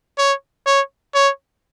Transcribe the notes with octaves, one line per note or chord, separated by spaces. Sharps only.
C#5
C#5
C#5